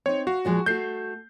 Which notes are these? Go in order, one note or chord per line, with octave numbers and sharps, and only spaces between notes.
C4 D#4 C#5
F#4 F5
A#2 F3 G#3
A3 F#4 G6 C7